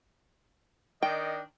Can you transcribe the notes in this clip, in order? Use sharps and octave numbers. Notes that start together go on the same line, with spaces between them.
D#3 D4 D#5 G5